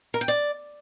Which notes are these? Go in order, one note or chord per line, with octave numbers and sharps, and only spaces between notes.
A#4
G5
D5